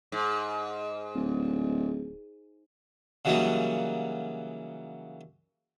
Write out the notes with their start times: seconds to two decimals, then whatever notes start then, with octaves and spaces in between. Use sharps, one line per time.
0.12 G#2
1.15 D1
3.25 C#3 E3 F#3 G3 A#3 D#4